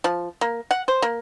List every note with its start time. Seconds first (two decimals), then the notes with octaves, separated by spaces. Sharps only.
0.04 F3
0.41 A#3
0.71 F#5
0.88 C5
1.02 A#3